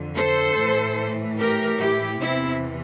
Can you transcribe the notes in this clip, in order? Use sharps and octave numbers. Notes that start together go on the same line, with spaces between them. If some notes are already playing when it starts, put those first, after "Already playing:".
Already playing: F2 D3
A4 C5
A2 E3
G4 A#4
E4 G4
E2 C3 E3 C4 E4